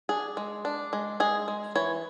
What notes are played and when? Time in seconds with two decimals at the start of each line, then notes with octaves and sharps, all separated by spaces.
0.09 D4 G#4
0.37 G#3
0.65 D4
0.93 G#3
1.20 G#3 G#4
1.48 G#3
1.75 E3 C#5